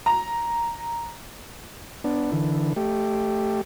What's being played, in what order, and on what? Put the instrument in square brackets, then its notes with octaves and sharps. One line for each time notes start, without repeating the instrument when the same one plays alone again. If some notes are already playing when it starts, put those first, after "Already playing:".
[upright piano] A#5
[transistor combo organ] B3 D4
D3 E3
A3 G4